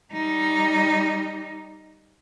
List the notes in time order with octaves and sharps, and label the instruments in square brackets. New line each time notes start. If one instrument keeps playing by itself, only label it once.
[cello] G3 D#4